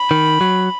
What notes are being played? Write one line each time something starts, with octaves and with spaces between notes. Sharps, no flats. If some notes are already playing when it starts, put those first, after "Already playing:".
Already playing: B5
D#3
F#3